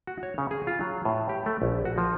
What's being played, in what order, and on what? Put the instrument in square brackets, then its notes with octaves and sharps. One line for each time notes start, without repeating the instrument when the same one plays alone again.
[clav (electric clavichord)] F#4
C#5
C#3
G#4
F4
F#3
A2
G4
A3
A#1
F#4
F3